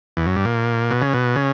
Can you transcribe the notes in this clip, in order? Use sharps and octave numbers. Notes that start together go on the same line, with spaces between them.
E2
F#2
G2
A#2
B2
C#3
B2
C#3